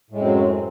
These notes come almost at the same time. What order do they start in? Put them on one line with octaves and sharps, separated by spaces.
A2 G#3 F#2 C4 F#3